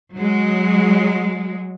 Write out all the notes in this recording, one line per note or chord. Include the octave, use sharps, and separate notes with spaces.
F#3 G#3